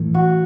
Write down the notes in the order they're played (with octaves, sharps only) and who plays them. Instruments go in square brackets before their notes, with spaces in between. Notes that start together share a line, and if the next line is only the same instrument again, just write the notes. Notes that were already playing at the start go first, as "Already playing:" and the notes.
Already playing: [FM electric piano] A2 E3 A3
[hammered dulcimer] F#4